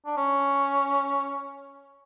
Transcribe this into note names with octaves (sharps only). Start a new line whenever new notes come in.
D4
C#4